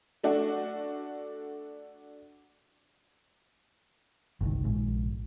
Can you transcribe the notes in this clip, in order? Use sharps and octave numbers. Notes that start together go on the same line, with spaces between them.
A3 D4 F#4
G1 C2 D#3
A#1 G#2